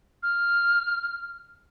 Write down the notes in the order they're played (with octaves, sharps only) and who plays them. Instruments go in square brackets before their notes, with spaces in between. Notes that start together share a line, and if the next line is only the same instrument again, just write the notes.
[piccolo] F6